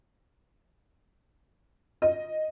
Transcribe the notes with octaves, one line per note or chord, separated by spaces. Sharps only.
D#5